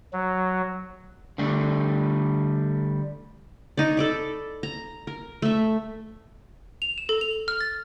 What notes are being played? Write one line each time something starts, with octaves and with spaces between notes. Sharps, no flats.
F#3
D3 G3 A3
D#4 C#5 D5
A4 D5 B5
A#5
A#4
A3 E5
F7
E7
A4
F7
F6
A6